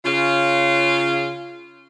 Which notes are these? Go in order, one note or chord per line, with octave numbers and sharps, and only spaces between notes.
C#3 F4